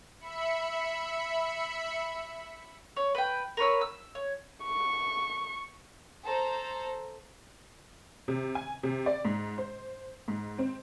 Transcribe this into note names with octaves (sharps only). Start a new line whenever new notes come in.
E5 B5 C#7
C#5
B4 G5
A#4 B4 C#5 E6
E6
C#5
C#6
A4 C5 A#5
C3
G#5
C3
D5
G#2
C5
G#2
C4